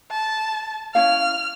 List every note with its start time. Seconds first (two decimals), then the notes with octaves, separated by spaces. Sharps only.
0.11 A5
0.95 C#4 E4 F5 F6